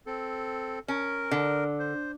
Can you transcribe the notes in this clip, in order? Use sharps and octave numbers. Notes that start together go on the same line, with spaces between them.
C4 A4
C#4 A#4
D3
C5